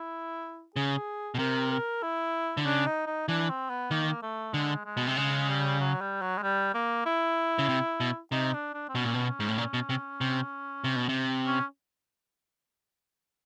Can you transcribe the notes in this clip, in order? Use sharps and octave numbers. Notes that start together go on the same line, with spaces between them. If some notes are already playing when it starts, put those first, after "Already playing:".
Already playing: E4
C#3 G#4
B2
C3 A#4
A#4
E4
D3
C#3 D4
D#4
D#4
E3 D4
C4
B3
D#3 A#3
A3
D3 G#3
G#3
B2
C3
C#3 G#3
G3
F#3
G3
F#3
G#3
G3
A#3
E4
C#3
C3
B2
C3 D#4
D4
D4
C4
B2 C#4
A#2
B2
G#2
A2
A#2
B2
C3
C3
C3
B2
C3
C#4